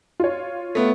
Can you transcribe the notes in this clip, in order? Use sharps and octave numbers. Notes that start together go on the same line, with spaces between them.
F4 C#5
A3 B3